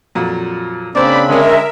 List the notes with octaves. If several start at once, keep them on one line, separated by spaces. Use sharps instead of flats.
F2 A#2 F#3
C#3 A#3 C4 D4 C5 D5 B5
D3 G#3 C#4 A#4 E5